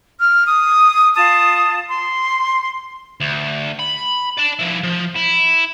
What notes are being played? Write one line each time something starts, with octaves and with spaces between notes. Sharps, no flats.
F6
D#6
F4 A5 D#6
C6
D2
B5
D5 A5
F3 E4
F3
E4